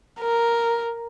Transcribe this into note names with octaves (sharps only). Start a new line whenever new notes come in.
A#4